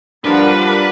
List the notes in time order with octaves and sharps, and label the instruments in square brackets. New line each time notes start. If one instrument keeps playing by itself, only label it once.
[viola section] F3 G3 F#5 [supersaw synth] D4 A#4 [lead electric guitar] B4